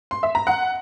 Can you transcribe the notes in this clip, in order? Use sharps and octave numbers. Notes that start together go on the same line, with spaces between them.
C6
E5
A#5
F#5